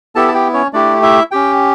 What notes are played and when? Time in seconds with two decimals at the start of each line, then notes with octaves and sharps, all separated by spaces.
0.15 B3 E4 G4 A4 A5
0.28 A5
0.34 G4 G5
0.54 C#4 C#5
0.73 A3 D4 E4 G4 D5
1.03 E4 E5
1.31 C#4 G4 G5